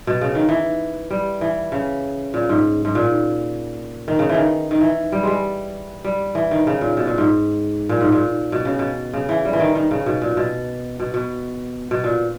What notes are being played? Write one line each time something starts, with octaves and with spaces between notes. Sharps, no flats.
B2
C#3
D#3
E3
G3
E3
C#3
A#2
G#2
G#2
A#2
D#3
C#3
D#3 E3
D#3
E3
G3
G3 G#3
G3
E3
D#3
C#3
A#2
B2
A#2
G#2
A#2
G#2
A#2
B2
C#3
B2
C#3
E3
G3
E3
D#3
D#3
C#3
B2
A#2
B2
B2
B2
B2
A#2